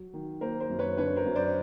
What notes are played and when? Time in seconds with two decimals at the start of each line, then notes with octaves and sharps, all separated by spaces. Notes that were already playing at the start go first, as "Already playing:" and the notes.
Already playing: F#3
0.14 D#3
0.41 A#3 A#4 C5
0.60 A#4 C5
0.70 F#2
0.79 B4 C#5
0.97 D3 B4 C#5
1.16 A#4 C5
1.26 F#2
1.35 C5 D5